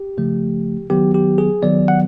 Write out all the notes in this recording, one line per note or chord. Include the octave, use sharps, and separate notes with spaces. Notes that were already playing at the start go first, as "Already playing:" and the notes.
Already playing: G4
C#3 F3 A3
D#3 F#3 B3 G4
G4
G#4
D#3 F#3 B3 D5
F#5